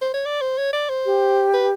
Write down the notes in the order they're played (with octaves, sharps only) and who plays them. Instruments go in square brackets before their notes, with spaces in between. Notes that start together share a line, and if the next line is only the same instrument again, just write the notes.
[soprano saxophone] C5
C#5
D5
C5
C#5
D5
C5
[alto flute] G4
[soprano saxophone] B4